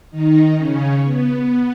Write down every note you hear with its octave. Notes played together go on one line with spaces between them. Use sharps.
D#3 D#4
C#3 C#4
B3